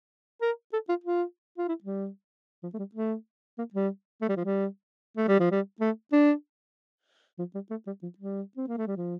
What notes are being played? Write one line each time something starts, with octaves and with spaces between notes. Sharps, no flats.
A#4
A4
F4
F4
F4
E4
G3
F3
A3
G3
A3
A#3
G3
A3
G3
F3
G3
A3
G3
F3
G3
A3
D4
F3
G3
A3
G3
F3
G3
C4
A#3
A3
G3
F3